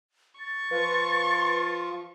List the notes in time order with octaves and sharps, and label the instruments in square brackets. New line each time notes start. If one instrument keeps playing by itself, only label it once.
[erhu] C#6 [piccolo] A6
[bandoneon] F3 F4 [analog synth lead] B4